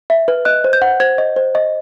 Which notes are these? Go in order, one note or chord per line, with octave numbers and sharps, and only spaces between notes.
E5
B4
D#5 F#6
C5
G6
F#5
C5 G#6
D#5
C5
D#5